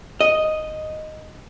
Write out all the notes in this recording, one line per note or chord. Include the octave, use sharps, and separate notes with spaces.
D#5